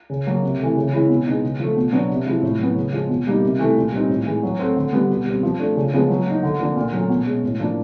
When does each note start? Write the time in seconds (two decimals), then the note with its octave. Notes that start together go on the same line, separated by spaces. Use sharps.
0.10 C#3
0.27 F#3 A#3
0.43 C3
0.59 E3 A3
0.77 C#3
0.93 E3 G#3 C#4 E4
1.09 B2
1.26 G#3 B3 D#4
1.43 C#3
1.60 F3 A3
1.76 B2
1.92 F#3 B3 D4
2.10 C3
2.26 F3 G#3 C4 E4
2.42 A2
2.59 F#3 B3
2.76 C#3
2.93 F3 G#3
3.09 B2
3.27 G3 A#3 D#4
3.43 C3
3.59 E3 A3
3.76 A#2
3.92 G3 C4 D#4
4.09 A2
4.26 E3 G#3
4.43 F#3
4.59 A3 C4
4.76 D3
4.93 G3 B3
5.10 B2
5.26 G3 C4
5.43 F3
5.59 A3 D4
5.76 C#3
5.93 F3 G#3 B3
6.09 F#3
6.26 A#3 D#4
6.43 D3
6.60 F3 A#3 D4
6.76 A#2
6.93 F#3 A3 C#4
7.09 B2
7.26 G#3 C#4
7.43 A2
7.60 F3 A#3 D4